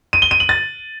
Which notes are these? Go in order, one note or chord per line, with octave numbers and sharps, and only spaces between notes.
D#7
G7
D#7
F#7
A6